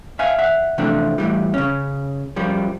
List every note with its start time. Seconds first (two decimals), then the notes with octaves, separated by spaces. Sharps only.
0.19 E5 F5 G#5
0.38 E5 F#5
0.78 C3 E3 F3 A3 C4 D4
1.18 A2 E3 G3
1.54 C#3 C#4
2.36 F#2 F3 G3